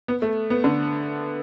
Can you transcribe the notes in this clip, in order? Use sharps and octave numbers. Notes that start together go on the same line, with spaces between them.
B3
A3
B3
D3